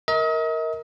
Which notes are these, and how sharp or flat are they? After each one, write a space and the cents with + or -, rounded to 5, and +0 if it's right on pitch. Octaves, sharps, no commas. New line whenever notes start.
A#4 +0 D#5 +40